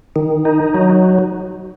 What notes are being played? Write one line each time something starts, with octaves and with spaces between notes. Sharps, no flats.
D#3
D#4
F#3